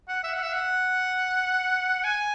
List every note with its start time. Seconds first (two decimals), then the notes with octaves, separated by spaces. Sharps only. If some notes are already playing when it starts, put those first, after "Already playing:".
0.08 F#5
0.23 E5
0.33 F#5
0.43 E5
0.53 F#5
2.04 G#5